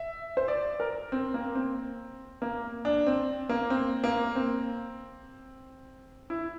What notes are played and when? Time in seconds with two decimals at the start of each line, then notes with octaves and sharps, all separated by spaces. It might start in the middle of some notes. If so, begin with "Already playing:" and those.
Already playing: E5
0.37 C5
0.48 D5
0.80 A#4
1.12 C4
1.34 A#3
1.55 C4
2.42 A#3
2.85 D4
3.07 C4
3.49 A#3
3.70 C4
4.04 A#3
4.36 C4
6.30 E4